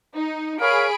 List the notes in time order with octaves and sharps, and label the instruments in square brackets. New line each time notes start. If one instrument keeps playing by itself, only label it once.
[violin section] D#4
[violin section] G#4 B5 D7 [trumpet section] A#4 C#5 F5